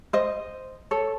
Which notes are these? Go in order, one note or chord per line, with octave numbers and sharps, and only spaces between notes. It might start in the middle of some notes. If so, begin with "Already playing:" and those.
C5 D#5
A4 C#5